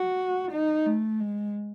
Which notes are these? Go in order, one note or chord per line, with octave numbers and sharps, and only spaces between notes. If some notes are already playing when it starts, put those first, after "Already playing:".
Already playing: F#4
D#4
A3
G#3